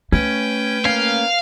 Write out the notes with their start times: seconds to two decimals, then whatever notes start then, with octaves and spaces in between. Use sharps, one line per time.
0.12 A3 C#4 B4 G5
0.85 A#3 C#4 F5